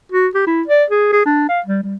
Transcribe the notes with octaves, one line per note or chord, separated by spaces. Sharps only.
F#4
G4
E4
D5
G#4
G#4
D4
F5
G3
G3